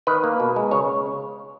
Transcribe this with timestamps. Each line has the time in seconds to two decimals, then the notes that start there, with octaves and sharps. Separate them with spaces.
0.07 D#3 B4
0.24 A#3
0.40 B2
0.56 G#3
0.71 C#3 C#5